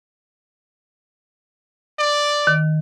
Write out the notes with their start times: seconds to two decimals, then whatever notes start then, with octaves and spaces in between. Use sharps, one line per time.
1.99 D5
2.47 D#3